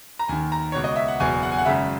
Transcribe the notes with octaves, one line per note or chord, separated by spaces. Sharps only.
A#5
D#2 D#3 G#5
A#5
C#2 B2 C#5
D#5
E5
F#5
F#1 E2 B2 G#5
F#5
G#5
F#5
G#1 F#2 C#3 E5